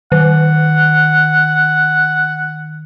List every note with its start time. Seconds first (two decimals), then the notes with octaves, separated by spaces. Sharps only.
0.12 D#3 F#5